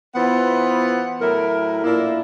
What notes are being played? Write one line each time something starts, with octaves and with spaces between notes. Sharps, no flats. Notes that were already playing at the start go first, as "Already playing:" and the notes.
E3 B3 F4 C5 F#5
A2 F#3 E4 A#4
A#2 A#3 D4 E4